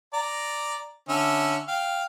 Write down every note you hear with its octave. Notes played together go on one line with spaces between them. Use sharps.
D5 A#5
D3 C#4 E5
F5 G5